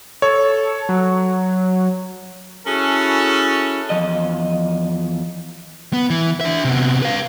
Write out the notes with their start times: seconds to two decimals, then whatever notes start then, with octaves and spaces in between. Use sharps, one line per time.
0.22 A4 C#5
0.89 F#3
2.67 C#4 E4 F#4 G#4 A4
3.90 E2 G2 F3 D#5
5.93 B3
6.10 E3
6.41 D4 E5
6.65 C3 B3
7.02 B4 F5